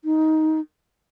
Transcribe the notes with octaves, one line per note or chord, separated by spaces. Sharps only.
D#4